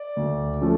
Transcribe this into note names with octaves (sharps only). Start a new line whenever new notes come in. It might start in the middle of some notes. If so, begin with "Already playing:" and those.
Already playing: D5
D2
F3 A3 C#4